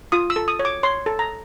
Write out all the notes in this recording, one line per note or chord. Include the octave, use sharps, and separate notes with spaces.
F4 D#6
E6
A4
D#6
C#5
D6
C#5 C6
A4
A#5